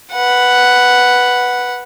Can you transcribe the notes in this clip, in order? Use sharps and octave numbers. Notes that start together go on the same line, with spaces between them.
B4 F#5